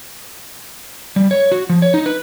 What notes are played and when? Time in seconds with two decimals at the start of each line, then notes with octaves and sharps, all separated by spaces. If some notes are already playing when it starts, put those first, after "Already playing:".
1.16 G3
1.31 C#5
1.52 F#4
1.69 F3
1.82 C#5
1.94 D#4
2.06 B4